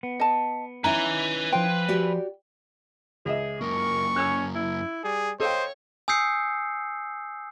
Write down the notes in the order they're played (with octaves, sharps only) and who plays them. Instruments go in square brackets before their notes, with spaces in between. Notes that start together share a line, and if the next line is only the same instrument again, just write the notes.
[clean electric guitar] B3
[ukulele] D#5 A5
[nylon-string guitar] C#4 D#4 E4 [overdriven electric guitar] B4 G#5 [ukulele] A#5
[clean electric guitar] F3 F4 C5 [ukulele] G5
[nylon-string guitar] F#4 G4 D5
[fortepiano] C#2 D#5 E5 [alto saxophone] G#4
[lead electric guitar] F#2 A#3 [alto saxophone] A#4 [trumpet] C#6
[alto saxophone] C#4 [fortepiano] E6 F#6
[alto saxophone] E4
[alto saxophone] G3 [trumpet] G#4
[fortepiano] A4 F5 G5 [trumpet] C5 [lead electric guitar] C#5 [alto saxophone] D#5
[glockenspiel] G#5 D#6 E6 G6 C7 C#7